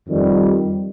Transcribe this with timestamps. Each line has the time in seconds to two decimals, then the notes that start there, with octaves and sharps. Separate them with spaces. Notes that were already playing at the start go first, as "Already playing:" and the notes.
0.08 F2 D#3 G3